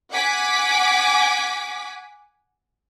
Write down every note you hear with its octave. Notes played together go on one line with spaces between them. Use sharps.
F#5 G#5 D6 B6